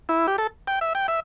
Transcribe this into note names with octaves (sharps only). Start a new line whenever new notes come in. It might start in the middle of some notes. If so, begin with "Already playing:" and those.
E4
G4
A4
G5
E5
G5
E5